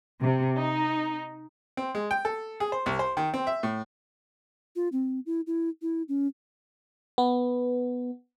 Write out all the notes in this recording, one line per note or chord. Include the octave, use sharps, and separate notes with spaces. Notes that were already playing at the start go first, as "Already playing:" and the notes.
C3
D#4
C4
G#3
G5
A4
G#4
C5
C2
C5
D#3
C4
E5
A2
F4
C4
E4
E4
E4
C#4
B3